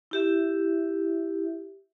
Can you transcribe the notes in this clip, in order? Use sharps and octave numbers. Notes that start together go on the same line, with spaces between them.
E4 G4 E5